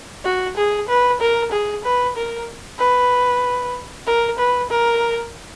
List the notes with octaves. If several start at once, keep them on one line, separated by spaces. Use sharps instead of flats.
F#4
G#4
B4
A#4
G#4
B4
A#4
B4
A#4
B4
A#4